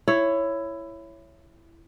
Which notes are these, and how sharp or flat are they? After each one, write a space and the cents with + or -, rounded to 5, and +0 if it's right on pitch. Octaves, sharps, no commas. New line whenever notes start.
E4 +15 C#5 +0